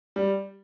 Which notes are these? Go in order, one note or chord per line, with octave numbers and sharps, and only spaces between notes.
G3